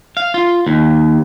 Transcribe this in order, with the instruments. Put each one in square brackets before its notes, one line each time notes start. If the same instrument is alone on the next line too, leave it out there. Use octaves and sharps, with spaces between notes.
[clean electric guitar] F5
F4
D#2